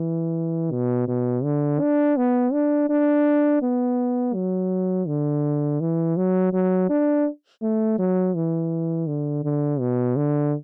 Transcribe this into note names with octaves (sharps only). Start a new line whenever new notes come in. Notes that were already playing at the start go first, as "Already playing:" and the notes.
Already playing: E3
B2
B2
D3
D4
B3
D4
D4
B3
F#3
D3
E3
F#3
F#3
D4
A3
F#3
E3
D3
D3
B2
D3